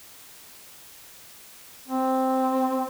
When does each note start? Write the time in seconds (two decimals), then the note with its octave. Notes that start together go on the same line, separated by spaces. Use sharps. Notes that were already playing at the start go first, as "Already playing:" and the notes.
1.88 C4